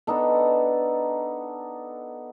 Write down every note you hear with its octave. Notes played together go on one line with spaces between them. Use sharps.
B3 D4 D#4 A4